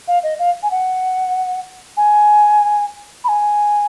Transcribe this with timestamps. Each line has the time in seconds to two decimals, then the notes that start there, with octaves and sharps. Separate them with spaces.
0.08 F5
0.23 D#5
0.39 F5
0.63 G#5
0.71 F#5
1.97 G#5
3.24 B5
3.28 G#5